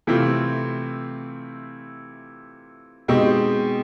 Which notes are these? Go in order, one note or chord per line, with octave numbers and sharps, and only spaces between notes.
C3 E3 A3 C4 F4
B2 G#3 C4 D#4 G4